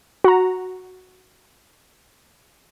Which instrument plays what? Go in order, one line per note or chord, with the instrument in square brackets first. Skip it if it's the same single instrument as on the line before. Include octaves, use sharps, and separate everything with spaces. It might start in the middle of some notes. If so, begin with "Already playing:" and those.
[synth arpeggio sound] F#4 A#5